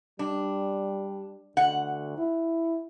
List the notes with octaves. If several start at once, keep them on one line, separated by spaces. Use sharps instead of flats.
G3 D4
D2 F#5
E4